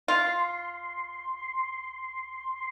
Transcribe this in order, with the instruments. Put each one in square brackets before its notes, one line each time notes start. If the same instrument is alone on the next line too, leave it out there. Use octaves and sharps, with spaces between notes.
[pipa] F4 [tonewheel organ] C6